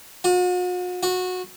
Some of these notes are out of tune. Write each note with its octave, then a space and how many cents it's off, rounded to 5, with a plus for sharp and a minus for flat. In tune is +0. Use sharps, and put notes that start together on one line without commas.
F#4 -45
F#4 -20